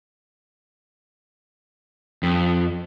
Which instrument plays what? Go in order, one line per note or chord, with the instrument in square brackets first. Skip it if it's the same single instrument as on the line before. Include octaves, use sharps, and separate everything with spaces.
[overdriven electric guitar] F2